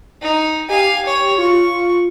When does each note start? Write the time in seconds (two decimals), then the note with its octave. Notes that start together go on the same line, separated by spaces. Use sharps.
0.22 D#4
0.69 G4 F5 G#5
1.05 C#5
1.38 F4 C#6